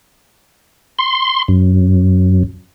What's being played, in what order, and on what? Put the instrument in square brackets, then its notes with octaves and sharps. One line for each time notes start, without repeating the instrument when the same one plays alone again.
[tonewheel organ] C6
F#2